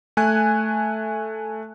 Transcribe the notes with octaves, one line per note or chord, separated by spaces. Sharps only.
A3 G#5 F#6